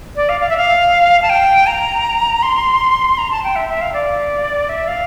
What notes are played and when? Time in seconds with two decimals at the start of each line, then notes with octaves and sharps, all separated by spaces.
0.16 D5
0.29 F5
0.41 F5
0.49 E5
0.57 F5
1.22 A5
1.29 G5
1.67 A#5
2.43 C6
3.18 A#5
3.31 A5
3.44 G5
3.56 E5
3.69 E5
3.81 F5
3.93 D5
4.69 E5
4.88 F5